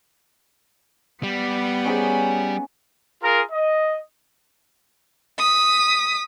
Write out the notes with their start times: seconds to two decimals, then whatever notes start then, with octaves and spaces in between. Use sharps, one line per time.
1.23 G3 B3
1.85 C#4 D#4 G#4
3.23 F4 G#4 A#4
3.51 D#5
5.39 D#6 B6